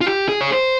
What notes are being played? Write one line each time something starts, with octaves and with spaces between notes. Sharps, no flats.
F4
G4
G#4
C#5
C5